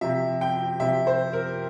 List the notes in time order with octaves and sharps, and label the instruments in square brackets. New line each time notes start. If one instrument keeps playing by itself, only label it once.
[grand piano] C3 F3 E5
G5
C3 F3 E5
C5
A#4